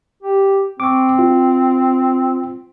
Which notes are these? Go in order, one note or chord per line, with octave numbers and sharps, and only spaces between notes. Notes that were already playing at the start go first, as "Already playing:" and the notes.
G4
C4 C#6 D6
F4